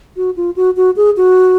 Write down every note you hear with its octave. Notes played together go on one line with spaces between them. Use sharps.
F#4
F4
F#4
F#4
G#4
F#4